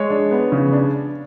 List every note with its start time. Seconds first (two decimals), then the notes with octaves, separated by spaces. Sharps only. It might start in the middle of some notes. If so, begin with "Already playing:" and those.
Already playing: G#3 C#5
0.10 D4
0.31 B3
0.52 C#3
0.73 D4